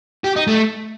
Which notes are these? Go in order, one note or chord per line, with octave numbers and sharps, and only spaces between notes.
G4
D#4
A3